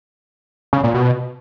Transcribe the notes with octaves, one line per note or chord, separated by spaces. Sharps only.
C#3
A#2
B2